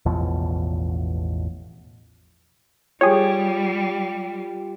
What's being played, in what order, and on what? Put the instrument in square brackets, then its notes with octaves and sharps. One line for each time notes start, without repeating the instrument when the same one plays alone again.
[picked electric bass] A1 E2 B2 F3
[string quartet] G3 [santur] F4 G4 [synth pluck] G#4 C#5